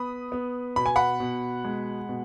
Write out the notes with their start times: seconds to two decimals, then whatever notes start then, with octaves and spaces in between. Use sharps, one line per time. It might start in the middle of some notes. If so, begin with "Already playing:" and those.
Already playing: B3 B5 D#6
0.32 B3
0.76 B2 B5
0.86 G#5
0.96 F#5 B5
1.20 B2
1.65 G#3
2.09 B2